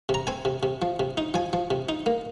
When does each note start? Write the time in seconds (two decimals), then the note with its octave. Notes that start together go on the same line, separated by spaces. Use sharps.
0.09 C3
0.14 A#5
0.27 C4 G#5
0.45 C3
0.63 C3
0.82 F3
1.00 C3
1.17 D#4
1.34 F3 G#5
1.53 F3
1.70 C3
1.89 D#4
2.06 A#3